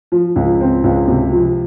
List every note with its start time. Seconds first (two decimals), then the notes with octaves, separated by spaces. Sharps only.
0.12 F3
0.36 C#2
0.61 C4
0.84 C#2
1.08 C3
1.32 F3